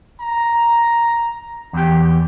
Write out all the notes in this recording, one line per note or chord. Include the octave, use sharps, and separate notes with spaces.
A#5
E2 G4